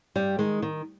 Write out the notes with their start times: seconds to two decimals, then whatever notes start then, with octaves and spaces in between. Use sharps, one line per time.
0.15 G2 G3
0.39 D#3 G#3
0.62 D#3